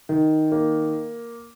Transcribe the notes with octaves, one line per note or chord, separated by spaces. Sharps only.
D#3
A#3